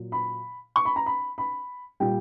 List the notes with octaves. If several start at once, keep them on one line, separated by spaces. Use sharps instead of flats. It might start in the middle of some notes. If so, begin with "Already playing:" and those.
Already playing: A#2 F#3
B5
C#6
B5
A#5
B5
B5
A#2 G3 G5